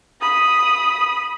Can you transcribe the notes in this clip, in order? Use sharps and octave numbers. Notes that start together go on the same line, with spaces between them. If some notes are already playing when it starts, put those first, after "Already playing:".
B5 D#6